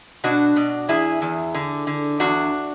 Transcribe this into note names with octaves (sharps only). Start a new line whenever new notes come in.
B2 D4 F#4
B2
E2 E4 G#4
E2
D3
D3
E2 D4 F#4